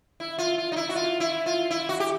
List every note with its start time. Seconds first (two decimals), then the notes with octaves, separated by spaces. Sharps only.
0.20 E4
0.38 F4
0.58 F4
0.72 D#4
0.76 E4
0.89 F#4
0.96 F4
1.20 E4
1.46 F4
1.70 E4
1.89 F#4
2.00 G4